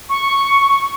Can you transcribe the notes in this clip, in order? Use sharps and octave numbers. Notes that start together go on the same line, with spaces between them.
C#6